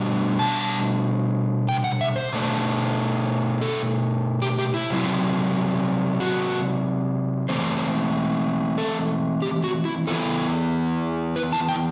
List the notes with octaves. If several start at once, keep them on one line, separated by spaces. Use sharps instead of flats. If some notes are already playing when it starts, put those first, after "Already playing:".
Already playing: B2 G3 D4
A5
G5
F#5
E5
C5
B2 A3 D4
A4
G4
G4
E4
C3 F#3 C4 E4
F#4
E3 A3 C4 C5
A4
G4
F#4
E4
E3 B3 E4 A4
B4
A5
G5